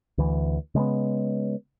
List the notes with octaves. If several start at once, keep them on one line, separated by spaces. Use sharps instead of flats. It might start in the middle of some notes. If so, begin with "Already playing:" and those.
D2 E3
C#3 G#3 A#3 B3